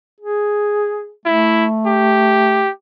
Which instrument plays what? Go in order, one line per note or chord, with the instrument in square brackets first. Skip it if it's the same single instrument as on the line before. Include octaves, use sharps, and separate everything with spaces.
[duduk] G#4
[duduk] A3 [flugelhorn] E4
[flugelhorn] G4